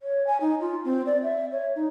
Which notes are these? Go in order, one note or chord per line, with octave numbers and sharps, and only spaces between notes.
C#5
G#5
D#4
F4
C4
D5
E5
C#5
D#4